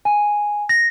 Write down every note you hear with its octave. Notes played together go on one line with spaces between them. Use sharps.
G#5
A#6